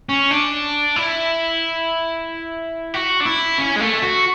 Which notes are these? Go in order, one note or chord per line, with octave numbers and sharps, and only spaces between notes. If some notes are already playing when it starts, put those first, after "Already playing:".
C#4
D4
E4
F#4
D4
E4
C#4
G#3
A3
F#4